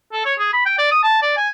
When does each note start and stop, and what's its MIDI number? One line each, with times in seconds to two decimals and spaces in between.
0.13 0.23 69
0.26 0.34 73
0.39 0.53 68
0.53 0.65 83
0.66 0.75 79
0.78 0.91 74
0.92 1.03 87
1.03 1.18 81
1.22 1.34 74
1.37 1.49 80